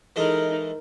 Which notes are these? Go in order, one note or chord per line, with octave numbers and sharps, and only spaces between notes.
E3 G#3 D#4 A4 A#4